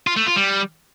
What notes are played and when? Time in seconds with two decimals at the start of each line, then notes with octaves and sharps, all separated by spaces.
0.07 F4
0.16 A3
0.26 F4
0.36 G3